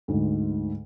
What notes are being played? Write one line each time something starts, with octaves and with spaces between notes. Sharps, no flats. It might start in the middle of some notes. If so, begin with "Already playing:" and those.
D2 G#2